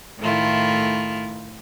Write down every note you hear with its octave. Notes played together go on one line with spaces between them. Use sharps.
A2 D#3 A3 E4 F4